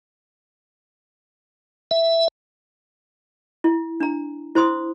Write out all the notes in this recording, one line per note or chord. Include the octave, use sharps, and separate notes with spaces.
E5
E4
D4 A#5
E4 C5 C6 D#6